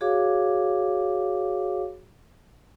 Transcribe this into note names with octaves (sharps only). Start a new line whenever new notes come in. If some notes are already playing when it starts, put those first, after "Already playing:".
F#4 G#4 C#5 F5 D6